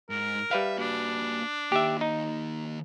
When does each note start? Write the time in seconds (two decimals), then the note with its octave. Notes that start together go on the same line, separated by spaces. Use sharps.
0.10 G#2 A#4
0.51 G3 B4 E5 F5
0.78 A#3 D4 F#4
1.72 D#3 A#3 G4 E5
2.01 D#4